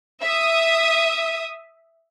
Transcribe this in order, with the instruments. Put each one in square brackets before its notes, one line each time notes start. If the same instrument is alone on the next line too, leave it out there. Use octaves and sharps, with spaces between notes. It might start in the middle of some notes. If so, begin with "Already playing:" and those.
[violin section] E5 D#6